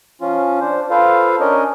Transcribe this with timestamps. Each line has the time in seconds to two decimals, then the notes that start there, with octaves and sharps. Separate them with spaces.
0.21 F3 C#4 F4
0.61 D4 C5
0.90 F4 A4 B4 C5 F5
1.40 C#4 D4 A#4 C#5 D#5